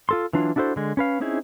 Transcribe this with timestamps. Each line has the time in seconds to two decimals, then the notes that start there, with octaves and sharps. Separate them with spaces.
0.09 F4 A4 C6
0.33 E3 F#3 D4 F4
0.56 D4 E4 F#4 A4 C5
0.76 D3 G#3
0.97 C#4 B4 F5
1.20 C4 C#4 D#4 E4 G#4